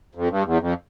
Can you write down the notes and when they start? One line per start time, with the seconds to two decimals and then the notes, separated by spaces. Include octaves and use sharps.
0.15 F2
0.30 G2
0.45 E2
0.60 F2